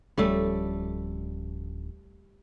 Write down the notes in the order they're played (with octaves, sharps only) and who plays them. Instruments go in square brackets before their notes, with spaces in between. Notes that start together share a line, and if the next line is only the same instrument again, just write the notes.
[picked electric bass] D1 F3 C#4 [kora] G3 A3 A4